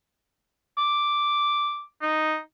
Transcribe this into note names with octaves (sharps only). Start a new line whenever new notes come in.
D6
D#4